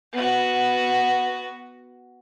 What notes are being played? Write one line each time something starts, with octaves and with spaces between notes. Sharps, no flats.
B3 F#4